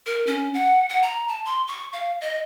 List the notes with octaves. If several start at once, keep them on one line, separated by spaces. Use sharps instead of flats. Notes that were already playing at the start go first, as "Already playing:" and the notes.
A#4
C#4
F#5
F#5
A#5
A5
C6
C#6
F5
D#5